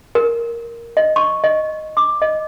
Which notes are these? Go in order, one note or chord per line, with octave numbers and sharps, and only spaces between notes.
A#4
D#5
C#6
D#5
D6
D#5